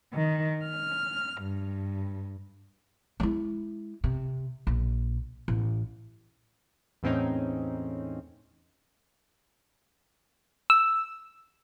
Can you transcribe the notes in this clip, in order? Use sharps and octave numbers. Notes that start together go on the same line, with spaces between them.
D#3
F6
G2
G#3 E4
C3
A#1
A1
E2 A2 C4 C#4 D#4
E6